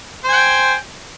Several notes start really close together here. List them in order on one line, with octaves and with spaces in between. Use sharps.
C5 G#5 G5